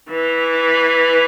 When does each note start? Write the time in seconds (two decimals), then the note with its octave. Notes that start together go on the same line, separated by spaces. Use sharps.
0.10 E3